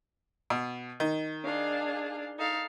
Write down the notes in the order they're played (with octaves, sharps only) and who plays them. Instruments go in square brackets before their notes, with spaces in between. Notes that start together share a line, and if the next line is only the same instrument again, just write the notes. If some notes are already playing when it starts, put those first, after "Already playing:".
[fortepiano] B2
D#3
[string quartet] D4 G#4 F5
D#4 A4 F5